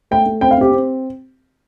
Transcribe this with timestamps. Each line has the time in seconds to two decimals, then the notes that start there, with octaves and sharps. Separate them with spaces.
0.11 A3 G5
0.26 A3
0.41 C4 G5
0.51 F5
0.57 C4 G4
0.72 C4